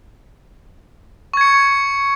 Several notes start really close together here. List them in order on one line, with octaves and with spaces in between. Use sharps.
C#6 G#6 C#7